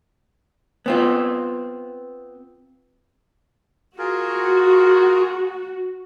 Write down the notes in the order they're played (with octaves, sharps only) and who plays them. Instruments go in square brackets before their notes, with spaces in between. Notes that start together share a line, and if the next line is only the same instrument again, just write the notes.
[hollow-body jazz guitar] B3 C4 F4
[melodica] F4 G#4 A#4 [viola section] F#4